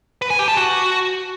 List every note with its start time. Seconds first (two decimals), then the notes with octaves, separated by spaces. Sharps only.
0.22 B4
0.30 G#5
0.39 G4
0.48 A5
0.57 F#4